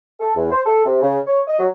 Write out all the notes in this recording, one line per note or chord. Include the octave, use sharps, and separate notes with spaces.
A4
E2
C5
A4
C3
C#3
C#5
D#5
F#3